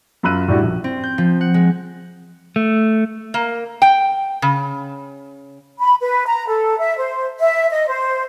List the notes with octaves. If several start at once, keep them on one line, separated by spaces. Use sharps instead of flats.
F#2 F4 B5 E6 F#6 D#7
A2 G3 D4 E4 F#4
A#1
C4
G6
F3
F#5
G#3
A3
A#3
G5
C#3
B5
B4
A#5
A4
E5
C5
E5
D#5
C5